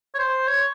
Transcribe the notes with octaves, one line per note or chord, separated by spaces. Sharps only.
C#5
C5
C#5